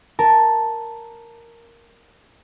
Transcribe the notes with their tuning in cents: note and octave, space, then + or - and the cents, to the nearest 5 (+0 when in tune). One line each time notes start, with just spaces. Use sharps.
A#4 +0 A5 +0